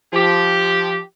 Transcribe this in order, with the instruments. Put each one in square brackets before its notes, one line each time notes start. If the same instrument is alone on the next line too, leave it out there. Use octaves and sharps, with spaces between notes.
[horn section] F3 G4